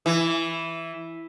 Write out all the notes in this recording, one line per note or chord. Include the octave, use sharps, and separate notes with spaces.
E3